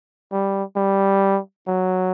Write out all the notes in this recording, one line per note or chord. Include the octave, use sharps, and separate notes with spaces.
G3
G3
F#3